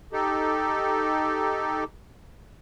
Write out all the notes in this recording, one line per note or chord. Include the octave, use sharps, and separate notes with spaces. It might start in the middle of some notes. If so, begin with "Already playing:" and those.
D#4 G4 A4